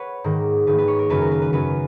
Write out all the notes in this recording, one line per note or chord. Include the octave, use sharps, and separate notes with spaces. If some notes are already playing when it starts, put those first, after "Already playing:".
Already playing: B4 C#5 F#5
G#2 D#3 A#3
G#2 D#3 A#3 B4
B4
C#5
A#4
F#2 C#3 F#3 B4
A#4
B4
B4
F#2 C#3 F#3 B4